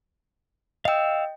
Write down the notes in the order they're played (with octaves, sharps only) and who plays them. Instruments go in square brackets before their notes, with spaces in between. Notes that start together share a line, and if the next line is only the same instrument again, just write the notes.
[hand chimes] D#5 G5 [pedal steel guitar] F5 E6